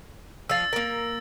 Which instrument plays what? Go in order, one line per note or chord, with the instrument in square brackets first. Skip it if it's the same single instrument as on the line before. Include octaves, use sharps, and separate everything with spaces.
[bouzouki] F3 F5 [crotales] E6 A6
[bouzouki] A#3 A#4